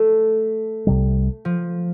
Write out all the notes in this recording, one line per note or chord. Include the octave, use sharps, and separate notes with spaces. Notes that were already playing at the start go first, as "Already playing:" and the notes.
Already playing: A3
C2 C3 G3
F3